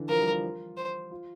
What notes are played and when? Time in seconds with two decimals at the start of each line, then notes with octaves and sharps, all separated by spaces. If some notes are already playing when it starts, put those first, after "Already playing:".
Already playing: D3 E3
0.09 F3 A#4
0.21 G3
0.31 F4
0.77 C5
1.11 F4